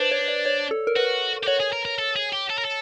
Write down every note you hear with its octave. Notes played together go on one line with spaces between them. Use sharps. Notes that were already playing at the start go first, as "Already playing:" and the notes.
Already playing: D4 B4 C5
C#5
D5
C#5
A4
A#4
F#4 B4
G4
F#4 C#5
G#4
A#4
A#4
A4
G#4
G4
A4
A#4
A4